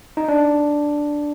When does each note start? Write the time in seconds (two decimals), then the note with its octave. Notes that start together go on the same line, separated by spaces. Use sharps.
0.17 D#4
0.28 D4